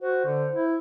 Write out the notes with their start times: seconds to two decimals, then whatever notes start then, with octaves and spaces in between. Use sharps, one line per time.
0.02 F#4 C5
0.25 D3
0.52 E4